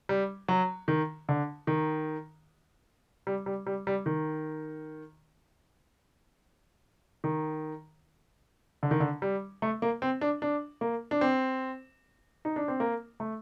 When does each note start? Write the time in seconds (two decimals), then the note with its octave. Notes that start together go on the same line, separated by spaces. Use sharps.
0.09 G3
0.48 F#3
0.88 D#3
1.29 D3
1.67 D#3
3.27 G3
3.46 G3
3.66 G3
3.87 G3
4.06 D#3
7.24 D#3
8.83 D3
8.91 D#3
9.00 D3
9.22 G3
9.62 A3
9.82 A#3
10.02 C4
10.21 D4
10.42 D4
10.81 A#3
11.11 D4
11.21 C4
12.45 D#4
12.56 D4
12.68 C4
12.80 A#3
13.20 A3